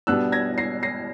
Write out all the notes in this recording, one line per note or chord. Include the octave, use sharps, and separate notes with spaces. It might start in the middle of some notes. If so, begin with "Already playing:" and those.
B2 G3 B3 D4 E6 F#6
G#6 A#6
A#6 C7
A#6 C7